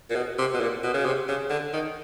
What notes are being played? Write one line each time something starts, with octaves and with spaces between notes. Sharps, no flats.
A#2
B2
C3
B2
A#2
B2
C#3
C3
C#3
D3
D#3